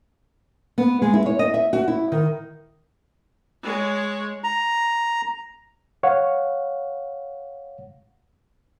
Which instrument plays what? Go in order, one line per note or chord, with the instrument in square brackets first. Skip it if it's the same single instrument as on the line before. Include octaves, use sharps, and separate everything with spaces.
[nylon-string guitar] B3
G#3
E4
C#5
D#5
E5
F#4
E4
D#3
[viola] G#3 C#5
[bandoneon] A#5
[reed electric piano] C#5 F5 F#5